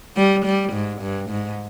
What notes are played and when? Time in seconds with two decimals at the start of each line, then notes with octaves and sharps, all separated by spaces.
0.16 G3
0.45 G3
0.73 G#2
1.01 G2
1.30 G#2